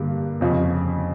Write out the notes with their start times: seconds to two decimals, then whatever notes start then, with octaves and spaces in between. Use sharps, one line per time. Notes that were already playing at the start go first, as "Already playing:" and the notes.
Already playing: G2 D3 G3 A#3
0.41 F2 C#3 F3